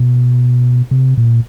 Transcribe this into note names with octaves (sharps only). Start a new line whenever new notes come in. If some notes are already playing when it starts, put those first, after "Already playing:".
Already playing: B2
C3
A#2